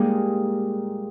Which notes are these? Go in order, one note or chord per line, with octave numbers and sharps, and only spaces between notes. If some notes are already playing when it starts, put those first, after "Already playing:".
Already playing: A#2 G3 G#3 A#3 D#4 G#4